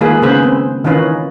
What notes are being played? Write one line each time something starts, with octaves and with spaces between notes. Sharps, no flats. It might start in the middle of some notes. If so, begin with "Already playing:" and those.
D#3 G#3 A#3 F4 G#4 B4
C#3 B3 G#4 B4 C5
C4
D#3 E3 C#4 D#4 F4 B4